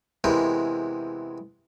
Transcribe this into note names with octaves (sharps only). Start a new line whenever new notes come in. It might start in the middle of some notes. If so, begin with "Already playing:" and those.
E2 C3 E3 G#3 A#4 G5